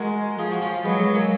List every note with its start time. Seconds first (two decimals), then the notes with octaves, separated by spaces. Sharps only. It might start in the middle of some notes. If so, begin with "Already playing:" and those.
Already playing: G#3 F#4 A#4
0.39 F3 F4 G#4
0.52 F#4
0.62 C#4 F4
0.85 F#3 G#3 B3
1.00 G#3 B3
1.15 A#3 C#4